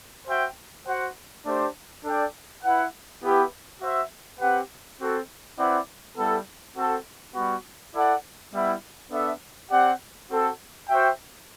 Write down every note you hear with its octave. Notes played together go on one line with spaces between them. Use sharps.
F#4 C5 E5 G5
F#4 C5 F#5
A3 D4 G4 C5
D4 A4 D5 G5
E4 B4 F#5
B3 E4 G4 B4 E5
F#4 C5 E5
C4 G4 B4 F#5
C4 F#4 A4
C4 E4 B4 D5 F#5
G3 B3 E4 A4
C4 F#4 A4
G3 B3 F#4
E4 A4 D5 F#5
G3 B3 E4
B3 D4 A4 E5
C4 G4 D5 F#5
C4 F#4 A4
F#4 C5 E5 G5